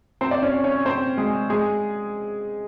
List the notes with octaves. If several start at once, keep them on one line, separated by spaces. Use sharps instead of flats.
C4 C5
D5
C#4 C#5
C#4 C#5
C4 C5
G#3 G#4
G#3 G#4